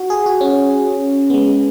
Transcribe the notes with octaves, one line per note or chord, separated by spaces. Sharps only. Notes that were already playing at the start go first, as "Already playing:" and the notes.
Already playing: F#4
G#4
F#4
C#4
B3
G#3